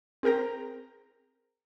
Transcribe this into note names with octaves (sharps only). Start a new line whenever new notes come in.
C4 G#4 A#4 G5 A#5